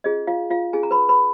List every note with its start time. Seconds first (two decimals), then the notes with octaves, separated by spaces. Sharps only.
0.04 C#4 F4 G#4 D#5
0.27 F4 F5
0.50 F4 F5
0.73 C#4 F4 G#4 G#5
0.83 A#5
0.91 B4 B5
1.09 B4 B5